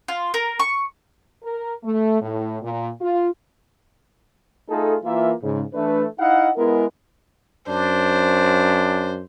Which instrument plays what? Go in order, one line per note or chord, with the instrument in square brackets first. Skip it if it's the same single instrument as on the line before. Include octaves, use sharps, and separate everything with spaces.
[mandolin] F4
A#4
C#6
[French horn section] A#4
A3
A2
A#2
F4
[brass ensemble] A3 D#4 F4 G#4 A4
E3 A#3 F4 E5
G#2 C#3
E3 A3 D4 B4
D#4 E4 D#5 F5 F#5
G#3 B3 E4 A#4
[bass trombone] F#2 [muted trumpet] D4 [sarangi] C5